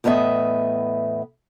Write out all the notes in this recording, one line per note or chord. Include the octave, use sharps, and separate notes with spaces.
E2 A2 B3 D#5 E5